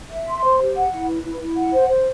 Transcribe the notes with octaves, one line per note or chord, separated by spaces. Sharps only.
E5
C6
C5
G4
F#5
E4
B4
E4
E4
F#5
C5
C5